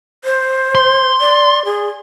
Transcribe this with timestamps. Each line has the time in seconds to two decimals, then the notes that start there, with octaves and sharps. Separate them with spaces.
0.24 C5
0.75 C6
1.20 D5
1.65 G#4